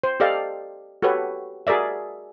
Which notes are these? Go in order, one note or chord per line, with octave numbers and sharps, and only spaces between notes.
C5
G4 A4 D5 D#5 F5
F#4 G4 A4 B4 C#5
F#4 G#4 A#4 D5 E5